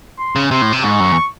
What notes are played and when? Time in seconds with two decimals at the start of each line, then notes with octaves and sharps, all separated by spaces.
0.19 C6
0.36 C#3
0.51 C3 C6
0.62 A2
0.73 C3
0.84 G#2 C#6
1.00 F#2
1.12 E2